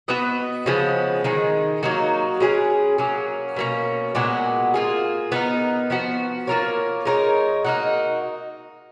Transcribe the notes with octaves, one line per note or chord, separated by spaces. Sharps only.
B3 F#4 B4 D#5
C#3 F3 G#3 B3
D#3 G#3 D#4
F#3 A#3 D#4 F#4
G#3 C#4 G#4 B4
F#3 A#3 C#4
B2 A#3 C#4
A#2 G#3 B3 F#4
A#3 F4 G#4
B3 D#4 A#4
F3 B3 F#4
A#3 F4 A#4 C#5
G#3 D#4 A#4 C#5
A#3 D#4 F#4